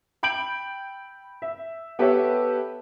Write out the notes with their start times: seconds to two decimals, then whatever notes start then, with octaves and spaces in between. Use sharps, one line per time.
0.23 G5 B5 G6 D7 F#7
1.42 E5
1.99 B3 G4 A4 B4 C#5 E5